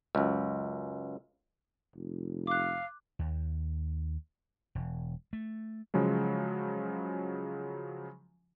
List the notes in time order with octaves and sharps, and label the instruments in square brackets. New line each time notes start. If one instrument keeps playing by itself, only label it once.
[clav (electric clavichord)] C#2 F#2
[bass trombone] F1
[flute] F5 [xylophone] D6 F#6
[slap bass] D#2
E1
A3
[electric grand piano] C#3 F3 F#3 G#3